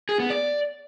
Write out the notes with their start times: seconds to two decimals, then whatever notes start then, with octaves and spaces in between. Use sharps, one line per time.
0.09 G#4
0.20 B3
0.30 D5